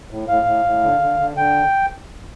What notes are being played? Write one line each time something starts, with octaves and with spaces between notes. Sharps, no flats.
A2
A2 F5
A2
A2
D3
D3
D3
D3 G5